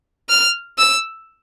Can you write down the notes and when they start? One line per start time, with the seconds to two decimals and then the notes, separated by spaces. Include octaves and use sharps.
0.29 F6
0.78 E6